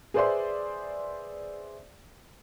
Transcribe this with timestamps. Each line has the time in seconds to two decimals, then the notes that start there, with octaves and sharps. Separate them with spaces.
0.14 G#4 B4 C5 D5 E5 C6